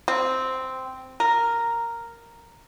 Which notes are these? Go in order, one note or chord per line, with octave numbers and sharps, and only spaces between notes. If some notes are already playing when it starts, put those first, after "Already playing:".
C4
A#4